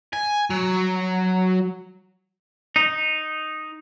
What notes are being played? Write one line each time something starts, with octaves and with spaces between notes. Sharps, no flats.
G#5
F#3
D#4